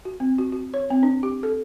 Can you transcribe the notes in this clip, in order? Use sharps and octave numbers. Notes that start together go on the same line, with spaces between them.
F#4
C4
F#4
F#4
C#5
C4
D4
G4
A4